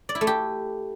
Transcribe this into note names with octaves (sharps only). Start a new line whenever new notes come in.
D5
E4
A3
G4